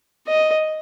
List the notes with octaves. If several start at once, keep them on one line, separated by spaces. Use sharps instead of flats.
D#5